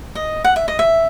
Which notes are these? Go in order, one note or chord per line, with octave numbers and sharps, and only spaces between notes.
D#5
F#5
E5
D#5
E5